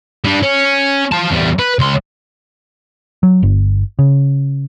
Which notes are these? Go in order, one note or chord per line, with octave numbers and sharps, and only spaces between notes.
G3 D4
C#4
F4 A5
E2 G3
B4
C#2 C6
F#3
G1
C#3